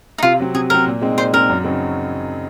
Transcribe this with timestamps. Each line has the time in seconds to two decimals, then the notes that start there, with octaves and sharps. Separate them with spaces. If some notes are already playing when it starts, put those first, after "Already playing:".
0.18 D#4
0.23 C3 F4
0.39 F#3 C4
0.54 C3 G#4
0.70 F#3 C4 A#4
0.86 A#2
1.02 G#3 C4 D#4
1.17 A#2 C5
1.34 G#3 C4 D#4 A#4
1.50 F#2
1.64 C#3 F#3 C4 D#4